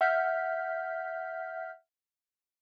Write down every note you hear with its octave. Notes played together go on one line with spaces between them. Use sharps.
E5 F#5 F6 G6 B6